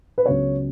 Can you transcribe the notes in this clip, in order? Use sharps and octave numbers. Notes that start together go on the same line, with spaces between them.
B4
C#2 C#3 F#3 B3 C#5